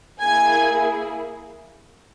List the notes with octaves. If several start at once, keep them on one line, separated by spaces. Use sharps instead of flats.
A#3 E4 G#4 G#5 G#6